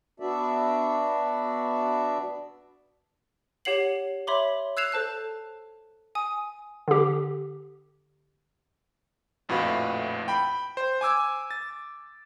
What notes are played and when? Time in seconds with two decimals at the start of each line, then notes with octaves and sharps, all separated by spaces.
0.20 B3 D4 F#4 D5 E5
3.65 G4 C#5 F#5 C7 F#7
4.27 C#5 E5 B5 C6 D6
4.77 E6 F#6 G#6 C7 E7 F7
4.92 A4 C5 A5 F#6
6.15 G#5 D#6
6.88 D3 G4
9.49 A#1 F2 A2 F#4 B4 F5
10.28 G5 B5
10.77 C5
11.01 G#5 D6 E6 G#6
11.51 A6